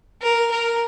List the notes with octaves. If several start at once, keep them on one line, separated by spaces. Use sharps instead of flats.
A#4
A#4